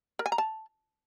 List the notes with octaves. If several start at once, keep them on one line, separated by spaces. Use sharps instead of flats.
A#4
G#5
A#5
A5